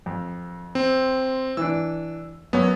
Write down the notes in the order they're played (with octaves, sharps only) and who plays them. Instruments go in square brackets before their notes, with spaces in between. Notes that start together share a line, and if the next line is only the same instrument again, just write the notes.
[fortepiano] F2
[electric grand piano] C4
[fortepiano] E3 D4 [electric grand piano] E6
[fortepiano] F#2 C#5 [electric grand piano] B3